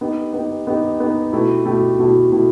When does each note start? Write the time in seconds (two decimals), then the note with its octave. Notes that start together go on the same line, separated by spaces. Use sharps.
0.01 B3 D#4 G4
0.33 B3 D#4 G4
0.67 B3 D#4 G4
1.00 B3 D#4 G4
1.33 B2 A3 E4 G4
1.65 B2 A3 E4 G4
1.99 B2 A3 E4 G4
2.31 B2 A3 E4 G4